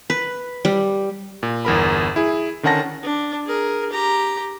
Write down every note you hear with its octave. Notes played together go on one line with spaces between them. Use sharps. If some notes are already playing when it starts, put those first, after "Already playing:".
B4
G3
A#2
G1 E2 A#4 B5
E4 G#4
D3 D#3 C#4 F#5 A5 A#6
D4
G#4 A#4
G4 A#5